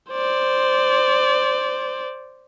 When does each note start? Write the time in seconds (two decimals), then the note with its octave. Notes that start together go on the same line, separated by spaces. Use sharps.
0.11 C5 D5